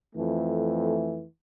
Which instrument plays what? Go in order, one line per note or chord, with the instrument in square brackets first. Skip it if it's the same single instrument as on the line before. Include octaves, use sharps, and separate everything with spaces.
[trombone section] F2 E3 A3